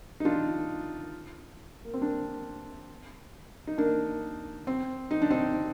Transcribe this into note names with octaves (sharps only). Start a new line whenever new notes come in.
D#4
D4 F4
A#3
C4
A#3 D4
D#4
A#3 D4
C4
D#4
D4
C4 D#4